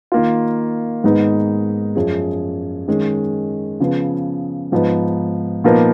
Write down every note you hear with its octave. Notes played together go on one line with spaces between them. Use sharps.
D#3 A#3 F4
G#2 D#3 G#3 B3 D#4
F#2 F3 G#3 C#4 G#4
D#3 G#3 C#4
C#3 F3 B3
G#2 F3 B3 D#4
A#2 F3 B3 D#4 A#4